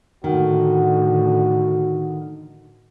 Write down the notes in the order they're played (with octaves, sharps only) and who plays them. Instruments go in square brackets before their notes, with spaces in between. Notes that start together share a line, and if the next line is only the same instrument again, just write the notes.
[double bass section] A2 D3 [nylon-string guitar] D#3 [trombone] F#4